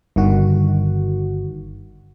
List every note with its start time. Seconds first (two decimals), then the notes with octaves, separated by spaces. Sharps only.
0.16 G1 D#3 F#4